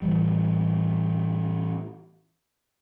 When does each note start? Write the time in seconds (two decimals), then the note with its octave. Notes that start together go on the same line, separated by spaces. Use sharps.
0.02 A2 E3 G3